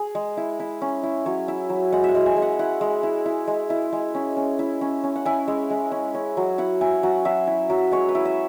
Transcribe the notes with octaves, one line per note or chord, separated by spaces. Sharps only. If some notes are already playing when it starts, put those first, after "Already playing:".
Already playing: G#4
G#3
E4
E4
C#4
E4
F#3 C#5
E4
F#3
G#3 F#5
E5 F#5
G#3
G#5
G#3
F#5
E4 F#5
G#3
E4
E4
G#3
E4
G#3
C#4
C#4
E4
C#4
C#4
F#5
E4 G#5
G#3
G#3
C#4
C#4
F#3
E4 F#5
E4 G#5
F#3 F#5
F#3 E5
E4
F#3
G#3 C#5
B4
E4
E5